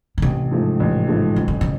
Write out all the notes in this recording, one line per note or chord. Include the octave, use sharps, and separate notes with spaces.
C#3
A1 C3
G#2 F3 A3
A1
G#2 F3 A3
F#2 C#3
D3
C#3